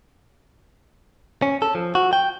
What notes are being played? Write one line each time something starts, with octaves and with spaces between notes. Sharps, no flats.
C#4
A4
F3
F#4
G5